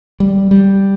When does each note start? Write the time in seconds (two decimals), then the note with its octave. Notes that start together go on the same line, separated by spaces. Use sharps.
0.20 G3
0.51 G3